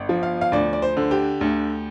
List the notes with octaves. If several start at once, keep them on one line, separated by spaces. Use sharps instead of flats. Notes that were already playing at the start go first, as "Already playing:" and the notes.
Already playing: G1
F3
F5
F5
D2 D5
D5
C5
D3
G4
D2